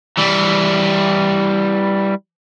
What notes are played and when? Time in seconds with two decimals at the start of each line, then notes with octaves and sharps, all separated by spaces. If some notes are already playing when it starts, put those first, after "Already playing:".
0.18 E3 G3